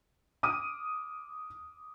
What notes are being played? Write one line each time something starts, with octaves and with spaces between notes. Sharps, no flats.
D6 D#6 F6 D#7